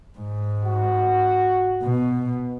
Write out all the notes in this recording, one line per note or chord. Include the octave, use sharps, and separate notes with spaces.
G#2
F#4
B2